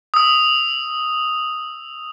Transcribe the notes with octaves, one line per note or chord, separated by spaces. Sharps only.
D#6 E6